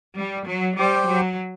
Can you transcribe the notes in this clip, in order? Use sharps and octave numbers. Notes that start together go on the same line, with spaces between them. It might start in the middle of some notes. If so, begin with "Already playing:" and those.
G3
F#3
G3 G4 C5 G5
F#3